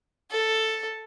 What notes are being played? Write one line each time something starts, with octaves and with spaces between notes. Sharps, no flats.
A4